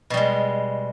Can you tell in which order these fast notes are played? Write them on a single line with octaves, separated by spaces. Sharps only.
B2 G3 G#3